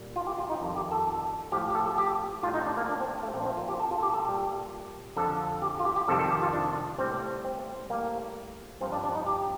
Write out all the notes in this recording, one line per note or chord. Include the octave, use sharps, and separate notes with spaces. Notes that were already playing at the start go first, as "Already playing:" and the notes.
Already playing: A#2 G3
F4
G4
F4
D#4
F2 D#3 G3
G4
A4
A2 F3 G4
G4
A4
A4
G4
A2 G3 F4
D#4
D4
A#3
D4
C4
A3
A#2 F3 C4
D4
C4
F4
G4
A4
F4
A4
G4
A4
A#2 G3 G4
F2 D3 F3 A4
G4
F4
G4
G4
F2 C3 D#3 G3 A4
A4
G4
F4
D4
A2 G3 C4
C4
A2 G3 A#3
G2 F3 C4
D4
D4
D#4
G4